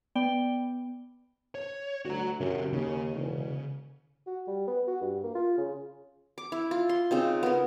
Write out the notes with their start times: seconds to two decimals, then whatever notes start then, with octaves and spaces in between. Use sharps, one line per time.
0.15 B3 D5 G5
1.55 C#5
2.05 D2 F#4 A#5
2.40 F#2 C#3 G4
2.72 D#2 C#3
3.16 E1
4.26 F#4
4.47 G3
4.67 B3
4.87 F#4
5.01 G2
5.23 A#3
5.35 F4
5.58 C#3
6.38 D6
6.52 E4
6.71 F4
6.89 C6
7.11 C#3 C4 D#4
7.43 B3 A#4